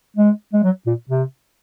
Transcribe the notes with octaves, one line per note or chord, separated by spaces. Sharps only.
G#3
G#3
F#3
A#2
C3